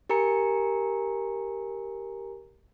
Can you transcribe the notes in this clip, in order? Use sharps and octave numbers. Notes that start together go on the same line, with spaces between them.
G4 A#4 G#5 A#5 C#7